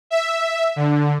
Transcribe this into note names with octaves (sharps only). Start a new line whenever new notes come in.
E5
D3